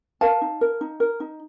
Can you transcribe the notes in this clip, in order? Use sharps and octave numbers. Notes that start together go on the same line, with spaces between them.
A#4 F5 A5
D#4
A#4
D#4
A#4
D#4